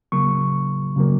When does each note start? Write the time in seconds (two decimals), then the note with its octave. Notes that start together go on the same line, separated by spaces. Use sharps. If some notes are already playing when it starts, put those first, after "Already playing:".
0.12 C#3 F#3 A#3 C#6
0.96 C#3 F#3 A#3